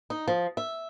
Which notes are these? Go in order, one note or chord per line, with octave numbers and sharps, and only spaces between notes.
D#4
F3
E5